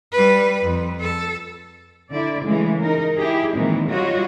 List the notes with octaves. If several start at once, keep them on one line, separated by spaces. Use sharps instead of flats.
G3 B4
F2
A4
D3 E4 D5
C#3 E3 G#3 A3
D#4 A#4
E4 G4 G#4
A#2 D#3 E3 G#3 C4
G3 F4 F#4 C#5 D#5